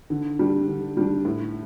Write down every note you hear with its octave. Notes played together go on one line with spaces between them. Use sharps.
D3
G3 D4
D3
G3 D4
A2